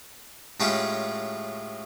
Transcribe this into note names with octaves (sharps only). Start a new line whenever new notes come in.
A2 G#3 C#4 F4 G4 G#4